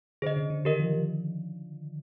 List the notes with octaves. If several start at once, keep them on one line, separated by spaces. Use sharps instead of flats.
D3 G#4 C5 D#5
C#3
D3
D#3 G4 A#4 D#5
F3
F3